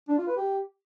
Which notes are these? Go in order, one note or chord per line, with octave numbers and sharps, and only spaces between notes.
D4
F4
B4
G4